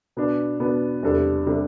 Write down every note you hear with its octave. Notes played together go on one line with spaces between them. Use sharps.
B2 B3 D4
B2 B3 D4
E2 C3 G3 D4 A4
C3 G3 D4 A4